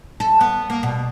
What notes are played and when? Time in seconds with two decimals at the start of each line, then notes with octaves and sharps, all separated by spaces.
0.20 A4
0.41 B3
0.70 A#3
0.83 B2